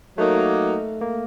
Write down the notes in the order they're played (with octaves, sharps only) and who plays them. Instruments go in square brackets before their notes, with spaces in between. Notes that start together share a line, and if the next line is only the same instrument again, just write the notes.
[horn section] F#3 A#3 D#4 [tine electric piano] A3
[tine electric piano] A#3